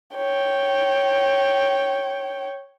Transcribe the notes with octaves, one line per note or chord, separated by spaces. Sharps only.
C#5 G5